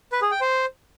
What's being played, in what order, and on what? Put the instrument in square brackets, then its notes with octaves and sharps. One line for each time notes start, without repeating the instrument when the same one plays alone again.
[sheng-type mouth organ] B4
G#4
G5
C5